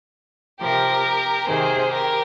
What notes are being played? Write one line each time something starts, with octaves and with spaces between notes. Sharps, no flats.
C3 F3 G4 A#4
C3 D#3 G#4 C5
G4 A#4